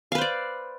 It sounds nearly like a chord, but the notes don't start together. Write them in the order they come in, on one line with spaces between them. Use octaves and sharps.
F5 B4 C5 D5